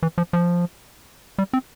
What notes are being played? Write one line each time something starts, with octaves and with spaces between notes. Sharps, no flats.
E3
F3
F3
G3
C4